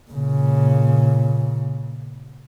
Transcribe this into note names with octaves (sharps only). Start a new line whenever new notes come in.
A#2 C#3